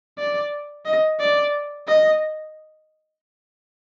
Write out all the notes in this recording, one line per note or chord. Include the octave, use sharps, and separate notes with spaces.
D5
D#5
D5
D#5